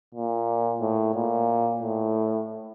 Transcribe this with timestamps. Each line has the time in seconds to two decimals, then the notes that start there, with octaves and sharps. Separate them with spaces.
0.14 A#2
0.81 A2
1.15 A#2
1.82 A2